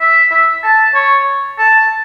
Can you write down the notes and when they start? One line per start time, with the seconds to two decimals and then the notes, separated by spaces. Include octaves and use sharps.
0.01 E5
0.32 E5
0.64 A5
0.95 C#5
1.58 A5